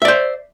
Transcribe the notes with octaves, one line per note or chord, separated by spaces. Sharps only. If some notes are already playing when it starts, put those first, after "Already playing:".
C5 D5 E5